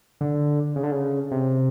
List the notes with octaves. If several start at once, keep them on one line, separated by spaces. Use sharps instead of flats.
D3
C#3
D3
C#3
C3